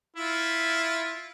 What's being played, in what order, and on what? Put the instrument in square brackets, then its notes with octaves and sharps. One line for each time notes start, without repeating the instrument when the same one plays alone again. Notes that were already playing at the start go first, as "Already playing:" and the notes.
[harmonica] E4 F4 E5